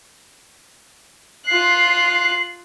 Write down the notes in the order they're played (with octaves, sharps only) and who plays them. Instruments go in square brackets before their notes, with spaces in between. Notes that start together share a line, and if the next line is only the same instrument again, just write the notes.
[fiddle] F4 F#6 [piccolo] C7